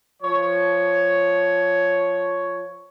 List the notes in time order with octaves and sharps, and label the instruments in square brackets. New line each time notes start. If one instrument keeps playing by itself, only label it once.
[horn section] F3 C#5